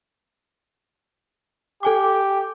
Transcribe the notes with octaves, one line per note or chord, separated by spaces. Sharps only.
G4 A4 G#5 D6